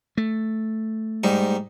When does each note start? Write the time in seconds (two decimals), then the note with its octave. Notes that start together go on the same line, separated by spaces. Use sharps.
0.17 A3
1.24 G#2 G3 D#4